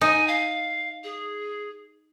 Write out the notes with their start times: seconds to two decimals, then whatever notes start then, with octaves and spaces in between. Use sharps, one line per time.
0.01 D#4 G#5
0.28 F5
1.04 G#4